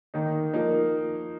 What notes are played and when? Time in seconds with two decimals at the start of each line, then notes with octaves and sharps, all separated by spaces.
0.14 D#3 A#3 D#4
0.53 F3 A#3 D#4